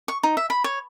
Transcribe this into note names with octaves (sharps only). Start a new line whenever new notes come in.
C#6
D#4
E5
B5
C#5